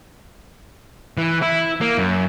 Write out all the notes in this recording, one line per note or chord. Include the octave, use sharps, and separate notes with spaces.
E3
E4
A#3
F#2